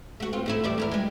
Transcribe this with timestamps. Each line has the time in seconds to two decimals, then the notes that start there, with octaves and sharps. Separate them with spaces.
0.20 A3 F#4
0.33 C4 F4
0.46 D#2 A3 E4
0.64 E2 G3 D5
0.78 E2 E4 A#4
0.91 G3 G#3